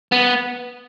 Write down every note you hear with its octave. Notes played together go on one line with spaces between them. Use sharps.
B3